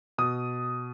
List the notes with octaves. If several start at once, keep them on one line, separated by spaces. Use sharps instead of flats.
B2 D#6